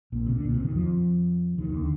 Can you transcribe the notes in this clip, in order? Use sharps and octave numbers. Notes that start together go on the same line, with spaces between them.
A#1 A#2
C3
D2 D3
A#1 A#2
C2 C3
D#2 D#3
F2 F3
D#2 D#3
D#2 D#3
D3